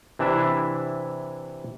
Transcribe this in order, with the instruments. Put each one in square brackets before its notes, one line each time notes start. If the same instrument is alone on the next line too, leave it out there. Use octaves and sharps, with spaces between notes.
[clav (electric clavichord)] C3 E3 D4 E4 E5